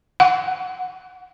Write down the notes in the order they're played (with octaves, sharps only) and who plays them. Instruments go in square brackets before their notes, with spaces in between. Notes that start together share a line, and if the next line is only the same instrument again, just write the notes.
[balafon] F#5